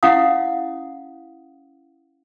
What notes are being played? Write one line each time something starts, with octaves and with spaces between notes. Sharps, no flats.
C#4 E4 F5 F#5 D#6